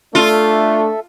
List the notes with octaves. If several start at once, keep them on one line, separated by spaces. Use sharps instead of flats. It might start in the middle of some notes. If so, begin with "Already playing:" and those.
A3 D4 F4 A4 E5